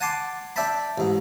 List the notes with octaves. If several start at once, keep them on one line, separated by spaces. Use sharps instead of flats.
F#5 G#5 A5 C6 D6
D4 E5 G5 A5 B5
A1 G#2